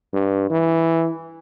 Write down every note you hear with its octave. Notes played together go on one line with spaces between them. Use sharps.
G2
E3